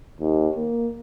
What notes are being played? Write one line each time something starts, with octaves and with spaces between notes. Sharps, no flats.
D#2
A#3